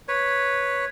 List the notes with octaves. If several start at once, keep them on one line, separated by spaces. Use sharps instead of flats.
B4 C#5